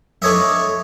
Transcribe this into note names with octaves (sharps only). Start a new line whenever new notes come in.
D4 A4 C#5 D#5 E5